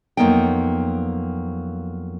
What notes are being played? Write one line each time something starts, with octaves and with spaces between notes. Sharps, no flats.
F2 F#3 A#3 B3 D#4 G5